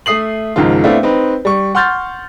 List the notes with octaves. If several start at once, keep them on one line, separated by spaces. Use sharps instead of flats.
A3 E5 D#6 C7 F#7
C#2 G#2 D#3 F3 F4
A3 B3 C4 D4 E4 F5
C4 D#4 B4
G3 C#6
F#5 C6 C#6 F6 G6 A6